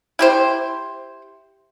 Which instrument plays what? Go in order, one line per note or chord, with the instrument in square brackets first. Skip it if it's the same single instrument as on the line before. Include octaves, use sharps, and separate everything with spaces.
[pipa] E4 G4 C5